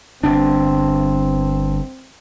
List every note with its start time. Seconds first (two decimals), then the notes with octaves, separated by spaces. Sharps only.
0.24 G1 C4 D4